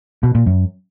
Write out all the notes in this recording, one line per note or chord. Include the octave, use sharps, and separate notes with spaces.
B2
A#2
F#2